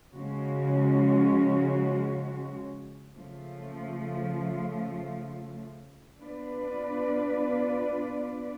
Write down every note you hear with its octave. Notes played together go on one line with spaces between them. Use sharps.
C#3 F3 G#3 C#4 F#4
C#3 F3 A3 F4
B3 D4 F4 B4 D5